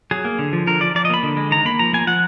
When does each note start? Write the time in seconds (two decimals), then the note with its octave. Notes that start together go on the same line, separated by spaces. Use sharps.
0.11 F#3 G#4
0.25 A#3
0.39 D3
0.53 F3
0.67 D3 A#4
0.81 F3 D5
0.95 F3 D5
1.05 D#5
1.10 A#3 B5
1.23 D3
1.37 G#3
1.51 D#3 A#5
1.65 A#3 B5
1.79 F3 A#5
1.93 A#3 G#5
2.07 F3 F#5